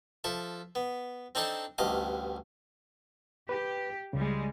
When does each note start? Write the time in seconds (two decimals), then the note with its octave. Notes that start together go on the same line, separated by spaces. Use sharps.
0.24 F3 A4 E5
0.75 B3
1.35 C4 D4 D#4 A4 C5 A5
1.78 A1 D2 G2 D#5 F5 D6
3.49 G4 B4
4.13 C#2 C#3 G3 G#3